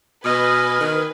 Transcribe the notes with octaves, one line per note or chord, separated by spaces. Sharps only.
B2 B4 D#5 G#5 F6
D#3